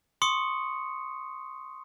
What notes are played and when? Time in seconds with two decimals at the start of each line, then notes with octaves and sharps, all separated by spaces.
0.22 C6 C#6 D#6 C#7